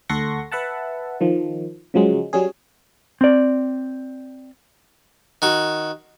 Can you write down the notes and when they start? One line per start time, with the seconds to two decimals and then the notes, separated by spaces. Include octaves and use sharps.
0.09 D2 A4 F#5 C6 C#6 A#6
0.52 B4 E5 F#5 A5
1.21 D#3 F3
1.94 C#3 F3 F#3 G#3
2.33 F#3 G3 C#4 G#4
3.21 C4 D5
5.42 D#3 F#4